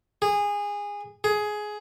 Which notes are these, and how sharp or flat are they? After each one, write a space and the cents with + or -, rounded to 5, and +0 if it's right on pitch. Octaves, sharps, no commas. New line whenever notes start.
G#4 -20
G#4 +15